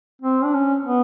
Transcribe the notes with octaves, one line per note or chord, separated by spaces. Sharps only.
C4
D4
C#4
B3